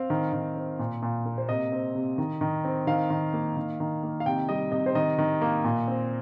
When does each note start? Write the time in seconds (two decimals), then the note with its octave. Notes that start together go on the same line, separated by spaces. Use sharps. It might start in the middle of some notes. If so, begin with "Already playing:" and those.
Already playing: C4 F5
0.10 D#3
0.33 D#3
0.56 C4
0.79 A#2
1.02 A#2
1.25 A#3
1.38 C5
1.49 C3 D#5
1.72 C4
1.95 C3
2.18 D#3
2.41 D#3
2.65 C4
2.87 D#3 F5
3.10 D#3
3.33 A#3
3.57 D#3
3.80 D#3
4.03 A#3
4.20 F5
4.26 C3 G5
4.49 G3 D#5
4.72 C3 D#5
4.86 C5
4.95 D#3 D#5
5.19 D#3
5.41 A#3
5.64 A#2
5.88 C4